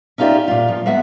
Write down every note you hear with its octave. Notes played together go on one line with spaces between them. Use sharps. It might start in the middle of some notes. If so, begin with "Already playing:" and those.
C#4 D#4 F4 G4 D5 E5
A#2 F4
F3
G#3 B3 E5 F#5